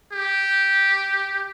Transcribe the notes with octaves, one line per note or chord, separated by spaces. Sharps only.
G4